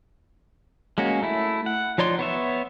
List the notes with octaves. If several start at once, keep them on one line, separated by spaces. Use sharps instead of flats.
G#3 A#3 C#4 F#4
A3 E4
F#5
F3 D#4 C#5 D5 C6
B3 C#5 E5